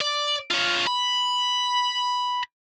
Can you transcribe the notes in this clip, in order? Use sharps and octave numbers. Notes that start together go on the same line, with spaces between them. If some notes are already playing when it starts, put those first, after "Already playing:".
D5
F4 C#5
B5